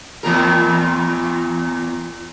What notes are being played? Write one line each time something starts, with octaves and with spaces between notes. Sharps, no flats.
E2 A#2 A#4